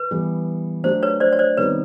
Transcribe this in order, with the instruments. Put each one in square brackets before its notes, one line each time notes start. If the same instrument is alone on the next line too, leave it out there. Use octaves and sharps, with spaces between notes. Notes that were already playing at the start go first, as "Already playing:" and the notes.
Already playing: [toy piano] B4
[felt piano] E3 G3 B3
[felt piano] F#3 A3 D4 G4 [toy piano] C5
[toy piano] B4 C#5
C5 D5
C#5
C5 D5
[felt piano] C3 D#3 G3 B3 [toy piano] B4 C#5